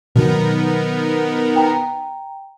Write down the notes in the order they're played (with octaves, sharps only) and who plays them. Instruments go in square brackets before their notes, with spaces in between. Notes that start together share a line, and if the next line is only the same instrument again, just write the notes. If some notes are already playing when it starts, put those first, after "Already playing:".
[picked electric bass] B2 D#3 F#3 [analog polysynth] B3 D#4 A#4
[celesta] G5 A#5